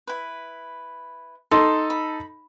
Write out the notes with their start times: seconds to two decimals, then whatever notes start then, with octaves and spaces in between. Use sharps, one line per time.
0.07 E4 B4
1.51 D#4 A4 C6
1.90 B5